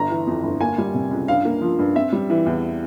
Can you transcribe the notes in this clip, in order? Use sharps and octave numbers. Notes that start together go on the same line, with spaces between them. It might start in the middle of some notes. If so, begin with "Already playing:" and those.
Already playing: G1 A#5
E3
F2
G1
A#3 G#5
G3
C3
C#2
G2 F5
A#3
F3
G2
C4 E5
G3
E3
E2